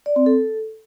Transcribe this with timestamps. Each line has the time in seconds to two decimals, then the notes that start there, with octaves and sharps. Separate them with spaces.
0.06 D5
0.16 C4
0.26 A4